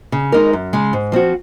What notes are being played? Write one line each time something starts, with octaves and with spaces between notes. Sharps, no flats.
C#3
G#3 D#4 A#4
F#2
C#3 G#3
G#2
F3 C4 F#4